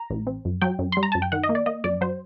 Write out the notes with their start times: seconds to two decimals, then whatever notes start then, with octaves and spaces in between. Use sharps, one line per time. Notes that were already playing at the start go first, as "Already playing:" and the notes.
Already playing: A#5
0.10 A1
0.27 C4
0.45 F#2
0.61 F#3 G5
0.79 F#2
0.92 G3 C6
1.03 A#5
1.12 F#2 A5
1.22 G5
1.32 D#3 F#5
1.43 D#5
1.49 A#3
1.55 D5
1.66 A#3 D#5
1.84 F#2 D5
2.01 F#3 C5